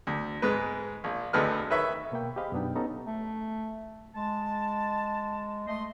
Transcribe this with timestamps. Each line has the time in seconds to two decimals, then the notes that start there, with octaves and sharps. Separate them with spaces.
0.07 D2
0.42 G#2 G#3 B4
1.04 A#1
1.33 G#1 D2 A4 B4 D#5 F6
1.70 D#3 B4 C#5 E5 B5
2.12 B2 A#3 G5
2.36 G4 G#4 C5 D#5 F5 B5
2.52 F#2 B2 B3 D4 D#4 G5
2.75 B3 C#4 D#4 G4 A4 A#5
3.06 A3
4.15 G#3 A5
5.68 A3 D#5 C6